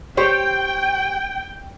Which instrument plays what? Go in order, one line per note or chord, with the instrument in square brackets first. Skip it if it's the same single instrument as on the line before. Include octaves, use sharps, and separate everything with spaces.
[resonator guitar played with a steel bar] G4 C5 C#5 [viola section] G5